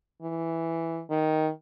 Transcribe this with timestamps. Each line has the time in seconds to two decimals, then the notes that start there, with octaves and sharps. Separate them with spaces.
0.22 E3
1.10 D#3